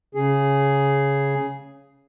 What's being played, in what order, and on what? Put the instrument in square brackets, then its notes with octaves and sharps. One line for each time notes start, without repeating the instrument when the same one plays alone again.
[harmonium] C#3 G#4